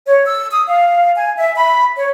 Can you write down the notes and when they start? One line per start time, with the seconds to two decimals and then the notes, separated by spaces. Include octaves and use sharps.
0.06 C#5
0.25 E6
0.51 D#6
0.67 F5
1.15 G#5
1.37 E5
1.56 B5
1.97 C#5